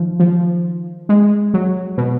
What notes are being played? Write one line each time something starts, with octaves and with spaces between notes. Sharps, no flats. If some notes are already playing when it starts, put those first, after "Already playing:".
Already playing: D#3 F3
F3
G#3
F#3
B2